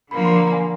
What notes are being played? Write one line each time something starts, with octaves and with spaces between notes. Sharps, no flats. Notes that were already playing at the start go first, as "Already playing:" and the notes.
D3 F3 A#3 B5
C6
A#5
G#5